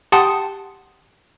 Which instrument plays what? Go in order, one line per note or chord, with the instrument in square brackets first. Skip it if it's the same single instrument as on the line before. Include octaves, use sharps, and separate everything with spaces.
[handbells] G4 F#5 G5 A5 C6 D#6